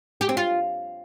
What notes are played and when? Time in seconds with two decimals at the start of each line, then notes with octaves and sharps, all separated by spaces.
0.21 G4
0.29 C4
0.37 F4